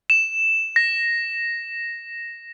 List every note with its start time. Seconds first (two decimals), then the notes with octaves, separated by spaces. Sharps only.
0.10 E7
0.76 A#6